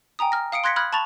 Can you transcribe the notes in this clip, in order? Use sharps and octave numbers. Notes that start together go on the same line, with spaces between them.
G5 G#5 A#5 D#6
F6 A#6
F5 D#6 C#7 D7
C6 F#6 G#6 A#6 B6 C#7
B5 D#6 F6 F#6 G#6
A5 B5 C#6 A6 F7